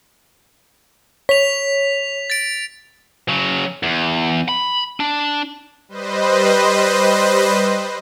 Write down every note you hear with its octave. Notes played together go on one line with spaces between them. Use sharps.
C#5 B6 F7
A6 D7
C#3 F#3
E2
B5
D4
G3 B4 C5 D#5